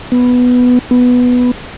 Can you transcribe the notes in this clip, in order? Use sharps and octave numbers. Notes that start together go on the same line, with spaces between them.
B3
B3